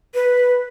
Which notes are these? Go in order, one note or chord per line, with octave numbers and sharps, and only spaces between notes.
B4